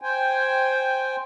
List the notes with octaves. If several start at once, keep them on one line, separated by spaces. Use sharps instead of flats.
C5 G5 G#5